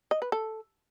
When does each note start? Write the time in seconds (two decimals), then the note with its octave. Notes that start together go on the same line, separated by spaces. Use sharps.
0.11 D#5
0.22 B4
0.32 A4